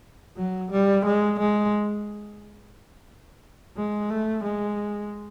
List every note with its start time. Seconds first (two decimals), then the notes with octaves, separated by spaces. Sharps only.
0.37 F#3
0.71 G3
1.05 G#3
1.39 G#3
3.76 G#3
4.10 A3
4.44 G#3